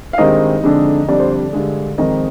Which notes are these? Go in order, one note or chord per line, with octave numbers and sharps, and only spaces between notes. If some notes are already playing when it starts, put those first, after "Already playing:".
F5
G2 D#3 G#3 C4 D#4 D#5
F2 D3 G#3 D4
F2 D3 G3 D4 D5
C5
D5
G2 D3 G#3
F2 D#3 G#3 C4 D#4 D#5